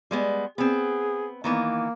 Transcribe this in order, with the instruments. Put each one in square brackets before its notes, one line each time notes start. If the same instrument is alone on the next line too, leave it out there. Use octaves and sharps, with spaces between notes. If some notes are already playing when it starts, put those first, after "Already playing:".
[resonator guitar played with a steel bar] G3 G#3 B3
[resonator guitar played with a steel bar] B3 C4 [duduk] G#4
[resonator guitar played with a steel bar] D#3 E3 B3 [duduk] A#3